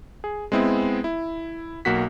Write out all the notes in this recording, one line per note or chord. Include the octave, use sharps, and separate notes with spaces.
G#4
G#3 B3 C4 E4
E4
B1 A#3 F#4 B6